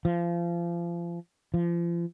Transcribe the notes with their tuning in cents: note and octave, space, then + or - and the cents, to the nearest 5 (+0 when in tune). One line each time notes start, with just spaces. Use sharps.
F3 -30
F3 -35